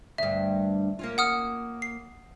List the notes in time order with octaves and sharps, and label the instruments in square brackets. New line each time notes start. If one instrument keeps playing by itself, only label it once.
[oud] D2 G2 [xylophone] E5
[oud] A#3 C#4 F4
[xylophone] F#5 D#6 F6
C7